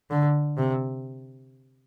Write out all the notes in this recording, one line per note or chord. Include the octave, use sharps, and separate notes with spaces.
D3
C3